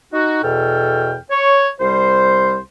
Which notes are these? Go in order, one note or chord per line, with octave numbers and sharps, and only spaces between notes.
D#4 F#4
E2 B2 A4 G5 F6
C#5
C2 G3 C5